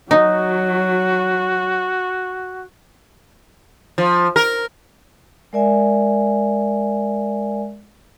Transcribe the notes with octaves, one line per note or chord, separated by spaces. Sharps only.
F#3 D#4 F#4
F3
A#4
G#3 A#4 D5 E5 G#5